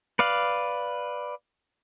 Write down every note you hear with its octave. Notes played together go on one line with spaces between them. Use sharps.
B4 D5 F5